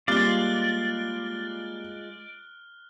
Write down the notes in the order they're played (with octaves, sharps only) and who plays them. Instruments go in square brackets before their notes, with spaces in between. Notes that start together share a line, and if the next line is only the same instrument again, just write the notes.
[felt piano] G3 A#3 [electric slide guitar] G#3 F4 [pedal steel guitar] D5 [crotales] F6 F#6 G7